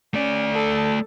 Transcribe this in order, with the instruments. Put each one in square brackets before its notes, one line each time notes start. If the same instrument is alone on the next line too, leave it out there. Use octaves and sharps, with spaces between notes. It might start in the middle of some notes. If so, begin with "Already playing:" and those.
[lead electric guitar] A3 D5 [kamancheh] C#4
[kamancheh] A4 A5